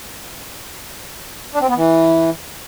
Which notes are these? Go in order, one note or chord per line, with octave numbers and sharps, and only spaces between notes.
D4
C4
B3
E3